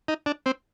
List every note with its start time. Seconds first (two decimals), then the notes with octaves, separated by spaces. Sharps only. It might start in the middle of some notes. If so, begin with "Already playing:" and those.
0.08 D#4
0.26 D4
0.46 C4